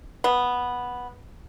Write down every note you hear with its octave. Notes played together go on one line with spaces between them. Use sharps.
B3